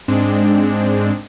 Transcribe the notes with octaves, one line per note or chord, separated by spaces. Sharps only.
G#2 G#3 C4 D4